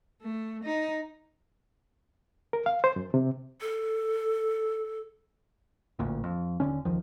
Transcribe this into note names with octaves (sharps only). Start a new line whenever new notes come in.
A3
D#4
A#4
F5
C5
F#2
C3
A4
A1 D2 A#2
F2
D#1 C2 D3 C#4
D#1 C#2 D#3 F3